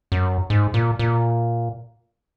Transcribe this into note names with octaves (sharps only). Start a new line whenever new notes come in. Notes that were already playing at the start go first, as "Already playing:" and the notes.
F#2
G#2
A#2
A#2